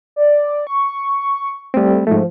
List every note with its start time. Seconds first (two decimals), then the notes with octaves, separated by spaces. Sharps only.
0.16 D5
0.67 C#6
1.74 G3 A3 C4
2.07 G#2 F3 A3